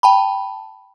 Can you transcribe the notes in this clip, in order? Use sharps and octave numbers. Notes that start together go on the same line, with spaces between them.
G5 A5 B5